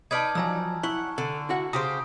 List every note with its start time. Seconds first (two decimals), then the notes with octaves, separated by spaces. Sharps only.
0.11 D#4 B4 D5 A5 F6 G#6
0.35 F3 F#3 G#5 A#5 E6
0.83 E4 F#5 C#6
1.18 D3 A4
1.49 E4 F#4 F#5
1.73 C#3 G4 C5 A#5 D#6